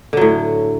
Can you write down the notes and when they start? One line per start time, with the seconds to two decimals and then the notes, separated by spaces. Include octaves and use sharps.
0.13 D3
0.17 F#3
0.21 A2